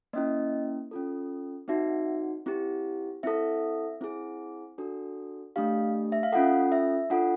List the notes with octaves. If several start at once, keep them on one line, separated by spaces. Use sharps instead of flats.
A#3 C#4 E4 D#5
C#4 F4 A4
C4 D#4 F#4 E5
C4 E4 G4
C4 E4 A4 E5
C4 E4 G#4
D4 F#4 A4
A3 D4 G4 F5
E5
F5
C#4 F4 A4 F#5
E5
D4 F4 A4 F#5